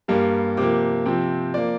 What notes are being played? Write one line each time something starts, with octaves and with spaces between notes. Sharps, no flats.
G2 G3 A#3
C3 F3 A#3 D6
C3 F3 C4
F3 A#3 D5